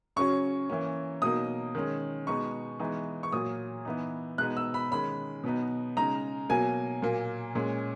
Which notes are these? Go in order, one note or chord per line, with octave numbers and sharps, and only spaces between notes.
C#3 F#3 C#4 C#6
E3 A#3 C#4
B2 F#3 A#3 D#4 D#6
D#3 G#3 C#4
B2 G#3 B3 D#4 C#6
E3 G#3 B3 D#4
C#6
A#2 F#3 A#3 D#6
E3 B3 D#4
B2 G#3 B3 D#4 F#6
E6
B5
D#3 G#3 C#4 B5
B2 F#3 B3 D#4
C#3 G#3 D#4 A#5
B2 F#3 A#3 G#5
A#2 F#3 A#3
A#2 G#3 C#4